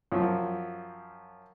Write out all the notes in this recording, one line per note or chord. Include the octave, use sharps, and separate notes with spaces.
F#2 F3